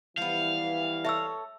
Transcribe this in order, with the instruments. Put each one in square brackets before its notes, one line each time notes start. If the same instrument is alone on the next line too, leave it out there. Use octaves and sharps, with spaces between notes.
[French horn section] E3 G3 [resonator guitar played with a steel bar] F3 B3 [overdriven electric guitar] F5
[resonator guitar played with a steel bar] A4 C#5 [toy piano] E5 E6